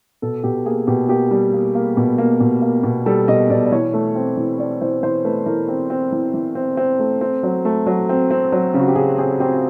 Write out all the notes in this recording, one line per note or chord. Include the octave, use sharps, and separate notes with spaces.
B2 A4
B2 G4
A#3 G#4
B2 G4
A#3 G4
G3
A#3
A#3
B2
A#3
B2
A#3
B2
G3 A4
B2 D#5
B2 D5
D5
E3 C#5
A3
C4
E3
C4 D5
E3 C5
E3 C5
A3 B4
E3 A#4
C4
C4
E3
E3
C4
C4
A3
C4
F#3
A3
F#3
C4
C4
F#3
C#3
F#4
G4
C#3 G#4
C4 G#4
C4 G4